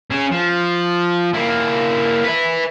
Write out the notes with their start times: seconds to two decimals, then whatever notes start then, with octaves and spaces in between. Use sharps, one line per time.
0.10 C#4 G#4
0.31 F3
1.33 A#3 E4
2.24 B4 E5